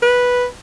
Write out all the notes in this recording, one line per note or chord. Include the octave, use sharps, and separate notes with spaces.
B4